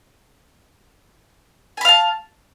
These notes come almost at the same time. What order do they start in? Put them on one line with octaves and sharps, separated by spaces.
G#5 B5 F5 A5